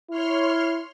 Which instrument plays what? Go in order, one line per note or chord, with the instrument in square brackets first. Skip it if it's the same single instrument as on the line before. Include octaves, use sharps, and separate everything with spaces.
[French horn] E4 [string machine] C#5 C6 F6